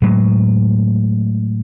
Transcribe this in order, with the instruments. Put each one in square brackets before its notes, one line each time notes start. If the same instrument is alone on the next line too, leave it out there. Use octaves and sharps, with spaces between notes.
[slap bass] A2 F#3 G#3